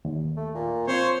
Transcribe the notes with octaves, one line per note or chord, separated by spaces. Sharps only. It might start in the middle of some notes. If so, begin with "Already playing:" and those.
D#2
A3
A#2
F3 C4 C5 C#5